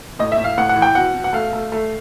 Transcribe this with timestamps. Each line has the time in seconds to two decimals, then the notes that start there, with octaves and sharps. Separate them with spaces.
0.19 A2 D#5
0.32 E5
0.38 A2
0.44 F5
0.58 A2 F#5
0.69 F#5
0.76 E3
0.82 G5
0.95 B2 F#5
1.14 B2
1.24 F#5
1.33 A3 F5
1.53 A3
1.72 A3